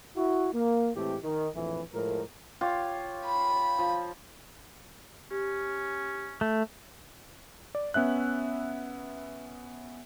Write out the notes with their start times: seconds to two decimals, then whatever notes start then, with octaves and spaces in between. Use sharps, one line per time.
0.16 E4 F#4
0.53 A#3
0.95 A2 E3 G#3 A3 C4 G4
1.23 D#3
1.54 A#1 F2 A2 E3
1.92 A2 F3 G#3 A#4
2.61 F4 G4 C#5
3.25 B5
3.79 F3
5.31 C#4 G4
6.41 A3
7.75 D5
7.94 B3 C#4 E5 F#6